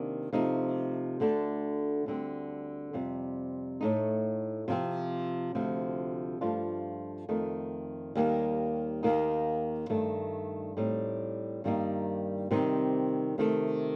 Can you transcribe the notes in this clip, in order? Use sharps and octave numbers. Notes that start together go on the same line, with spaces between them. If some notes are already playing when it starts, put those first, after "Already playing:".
Already playing: C3 D#3 A#3 D4
C3 F3 A3 D#4
D2 D3 A3 D4
D2 D3 G3 C4
F2 C3 G3
A2 A3 D#4
C3 F3 C4
D2 C3 F3
G2 F3 A3 D4 F4
F2 D#3 A3 D#4
D#2 D#3 G3 A#3
D#2 D#3 A#3 D#4
G2 D#3 A3
A2 G3 C4 D#4
G2 D#3 G3 A#3 D#4
C3 D#3 G3 C4 D#4
C3 D#3 A3